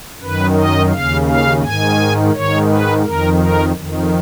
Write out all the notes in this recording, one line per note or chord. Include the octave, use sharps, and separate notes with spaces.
F#2 D#3 B4
D#5
D#2 C#3 F5
F5
G#2 D#3 G#5
G#2 D#3 C#5
B4
F2 D#3 A#4
A#4
F2 D#3